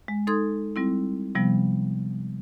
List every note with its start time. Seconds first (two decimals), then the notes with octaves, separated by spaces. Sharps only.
0.08 G#3
0.27 D#4 A4 C6 D#6 G#6
0.76 G3 C4 E4
1.35 C3 F3 G3 B3